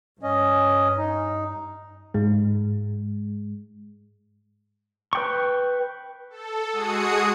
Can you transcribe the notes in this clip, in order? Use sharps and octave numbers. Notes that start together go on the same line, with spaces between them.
G2 C#4 D#5
D#4
G#2 G#3
B4 G5 C#6
A4
G#3 F#4 G#4 D#6 C#7